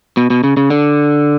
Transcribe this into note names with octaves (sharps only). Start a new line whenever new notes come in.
B2
B2
C#3
C#3
D3